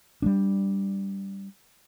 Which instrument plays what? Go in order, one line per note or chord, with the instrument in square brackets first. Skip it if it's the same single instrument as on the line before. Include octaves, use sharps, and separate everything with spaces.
[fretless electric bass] G3 B3 D4